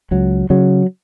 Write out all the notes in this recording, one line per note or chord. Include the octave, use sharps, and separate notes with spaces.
C#2 F#3
C#3 F#3